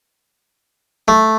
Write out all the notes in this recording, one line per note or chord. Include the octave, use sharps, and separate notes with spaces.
A3